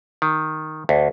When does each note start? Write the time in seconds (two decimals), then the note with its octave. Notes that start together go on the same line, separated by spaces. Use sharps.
0.22 D#3
0.89 D2